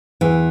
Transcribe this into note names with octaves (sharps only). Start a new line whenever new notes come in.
E2 E3